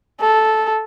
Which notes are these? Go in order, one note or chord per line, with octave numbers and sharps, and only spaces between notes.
A4